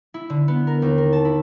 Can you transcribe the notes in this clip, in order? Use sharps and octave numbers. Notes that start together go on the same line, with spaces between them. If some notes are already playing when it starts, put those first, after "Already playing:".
E4
D3
B3
A#4
D#2
A#4
A5
E4